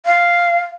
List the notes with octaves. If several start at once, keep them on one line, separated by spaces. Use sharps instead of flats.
F5